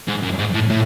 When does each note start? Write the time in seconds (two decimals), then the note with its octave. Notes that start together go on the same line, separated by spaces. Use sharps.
0.08 G#2
0.23 F#2
0.39 G#2
0.54 A2
0.70 A2